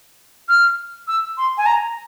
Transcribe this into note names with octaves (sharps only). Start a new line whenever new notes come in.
F6
E6
C6
G#5
A#5